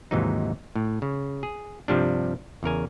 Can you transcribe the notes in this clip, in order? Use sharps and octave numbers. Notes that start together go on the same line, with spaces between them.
D#2 G#2 C3 E3 F#3 D#4
A2
C#3
G#4
G2 C3 F3 G3 D4
E2 C#3 A#4 G#5